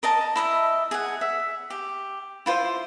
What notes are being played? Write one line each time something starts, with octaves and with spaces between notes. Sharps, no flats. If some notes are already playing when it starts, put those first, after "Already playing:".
A#4 D#5 A5 A#5
E4 D#5 E5
G#4 F#5
E5
G4
E4 F4 C5